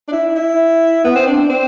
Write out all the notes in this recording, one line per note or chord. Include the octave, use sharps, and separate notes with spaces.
D4
E4
E4
B3
C4
D4
C4